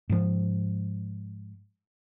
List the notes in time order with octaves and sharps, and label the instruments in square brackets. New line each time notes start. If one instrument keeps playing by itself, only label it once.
[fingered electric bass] G#2 F3